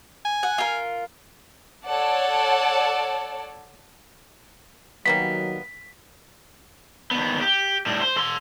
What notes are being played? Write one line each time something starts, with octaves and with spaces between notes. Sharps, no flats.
G#5
F#5
F4 A#4
A4 C#5 D5 F#5 A5
D#3 F#3 G3 A#3 B3 B6
D#2 B3
G4
A2 G3
C5
A4 C6